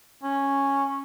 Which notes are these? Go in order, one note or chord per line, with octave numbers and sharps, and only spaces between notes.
C#4